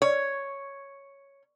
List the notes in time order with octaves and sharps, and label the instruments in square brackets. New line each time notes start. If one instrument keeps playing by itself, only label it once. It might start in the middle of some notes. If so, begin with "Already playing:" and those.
[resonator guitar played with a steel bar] C#5